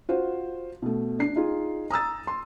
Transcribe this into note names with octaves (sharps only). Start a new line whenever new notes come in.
F4 F#4 C5
B2 A3
D4 C7
D#4 F4 G#4
A#5 D#6 E6 A6
C6